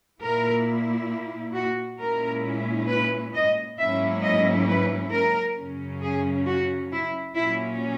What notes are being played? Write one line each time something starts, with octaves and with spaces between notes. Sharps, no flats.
A#2 A#3 E4 A#4
F#4
A#2 G#3 C#4 E4 A#4
B4
D#5
G#2 F#3 A#3 C#4 E4 E5
D#5
B4
A#4
F#2 C#3 F#3 C#4
G#4
F#4
E4
A#2 F#3 C#4 E4